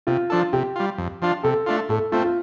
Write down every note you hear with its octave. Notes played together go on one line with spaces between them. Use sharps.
C3 F4
F3 D4 A4
C3 G4
G3 F4
F2
F3 D4 F4
C3 A4
A3 D4 F4
A2 A4
A3 C4 F4
F4